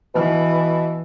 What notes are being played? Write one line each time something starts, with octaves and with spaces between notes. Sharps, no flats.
B2 E3